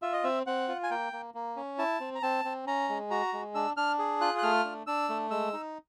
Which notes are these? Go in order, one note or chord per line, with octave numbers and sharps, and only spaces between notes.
F4 E5
D#5
C4 E5
C4 F#5
F4
G#5
A#3 G5
A#3
A#3
C#4
E4 A5
C4
A#5
C4 A5
C4
C#4 A#5
G#3
F#4 A#5
G#3
D4 E6
D4 F6
G#4
F4 F#6
F#6
A3 F6
D4
D4 E6
A3
G#3 E6
D#4